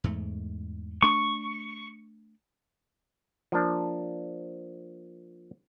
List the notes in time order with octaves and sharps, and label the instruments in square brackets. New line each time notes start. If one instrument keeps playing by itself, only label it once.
[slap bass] E2 G#2 A3
[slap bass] A3 D4 [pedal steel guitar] C#6
[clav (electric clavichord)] F3 A#3 D4